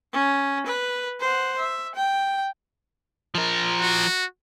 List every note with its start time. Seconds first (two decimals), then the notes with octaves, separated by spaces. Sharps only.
0.13 C#4
0.66 B4
1.20 C5 F#5
1.59 E5
1.95 G5
3.35 F3 A#4
3.80 F#4